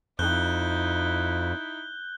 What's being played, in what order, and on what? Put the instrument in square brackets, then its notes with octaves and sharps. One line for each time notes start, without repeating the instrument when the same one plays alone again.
[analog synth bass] F2 [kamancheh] D#4 E4 [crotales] F#6 G6 G7